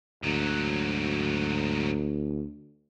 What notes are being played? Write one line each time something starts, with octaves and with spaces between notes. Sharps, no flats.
D2 G#2 F#3